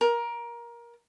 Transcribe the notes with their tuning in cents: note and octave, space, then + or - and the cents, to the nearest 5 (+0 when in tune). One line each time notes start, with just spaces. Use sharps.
A#4 +20